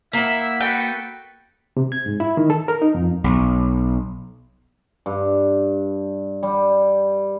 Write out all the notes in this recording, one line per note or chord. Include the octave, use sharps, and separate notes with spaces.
A#3 E4 E5 F#5
F#4 A4 B4 G5
C3
G#6
G#2
E4
D#3
A4
A#4
D#4
F2
B1
G2
G3